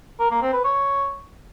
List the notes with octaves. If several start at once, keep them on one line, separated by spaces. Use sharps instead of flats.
A#4
A#3
C4
B4
C#5